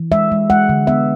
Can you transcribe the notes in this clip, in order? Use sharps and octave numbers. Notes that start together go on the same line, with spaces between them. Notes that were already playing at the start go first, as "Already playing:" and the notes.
Already playing: E3
G#3 E5
G#3
G#3 F#5
D3
B3 E5